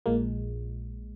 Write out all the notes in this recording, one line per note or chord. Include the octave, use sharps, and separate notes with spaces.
A#1 A#2 G#3 A#3